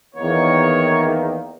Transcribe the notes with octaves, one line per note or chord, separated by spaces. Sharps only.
E2 D#3 A#3 C#5